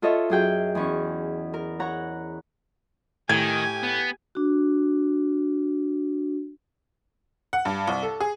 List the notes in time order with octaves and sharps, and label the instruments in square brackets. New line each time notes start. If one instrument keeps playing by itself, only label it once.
[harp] F4 A4 C#5 D#5 E5
F#2 G#4 G5
E2 C#4 C#6
A#4
C#5 F#5 A#5
[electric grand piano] A2 [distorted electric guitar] D#3 [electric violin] G4 G#5 [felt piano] G#6
[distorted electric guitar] B3
[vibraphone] D4 F#4
[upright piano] F#5
G2
C2
A4
G#4